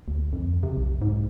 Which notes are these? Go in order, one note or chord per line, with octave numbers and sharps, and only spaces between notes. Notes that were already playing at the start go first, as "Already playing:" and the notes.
D2
F2
C3
B1
G#2